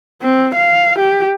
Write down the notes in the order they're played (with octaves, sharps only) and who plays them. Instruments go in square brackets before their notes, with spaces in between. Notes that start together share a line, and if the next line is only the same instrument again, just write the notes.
[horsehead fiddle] C4
F5
G4